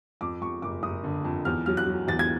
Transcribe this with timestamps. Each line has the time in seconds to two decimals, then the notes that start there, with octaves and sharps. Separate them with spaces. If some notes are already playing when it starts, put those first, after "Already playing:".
0.21 F2 D6
0.41 F2 C#6
0.62 F#1 D6
0.83 F#1 D#6
1.04 D3
1.24 F2
1.45 E2 F6
1.66 F#3 F6
1.77 F#6
1.88 F#3
2.08 E2 A6
2.19 G#6